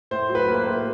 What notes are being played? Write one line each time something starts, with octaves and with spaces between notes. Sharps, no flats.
A2 C5
F#3
B4
A#3
B4
C5
A2